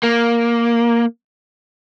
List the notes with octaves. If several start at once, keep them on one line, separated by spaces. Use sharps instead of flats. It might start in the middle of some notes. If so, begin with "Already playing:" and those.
A#3